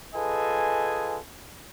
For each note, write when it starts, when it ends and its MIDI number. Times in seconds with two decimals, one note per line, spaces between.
0.15 1.18 65
0.15 1.18 68
0.15 1.18 69
0.15 1.18 71
0.15 1.18 75
0.15 1.18 80